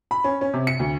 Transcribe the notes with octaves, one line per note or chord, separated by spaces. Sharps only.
B5
C#4
C#4
C3
C#7
D2